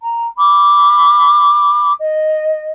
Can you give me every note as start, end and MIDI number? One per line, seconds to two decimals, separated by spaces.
0.03 0.25 82
0.37 1.92 83
0.37 1.92 86
1.98 2.71 75